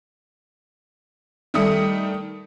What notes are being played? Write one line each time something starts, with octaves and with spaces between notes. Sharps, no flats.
D#3 G3 A3 D#6 C#7